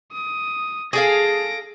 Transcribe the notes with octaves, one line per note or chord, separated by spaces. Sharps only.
D#6
G#4 A4 F5 A#6 D7